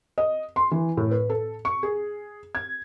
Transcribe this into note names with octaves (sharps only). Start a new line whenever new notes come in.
D#5
C6
E3
A2
B4
A4
C#6
G#4
G#6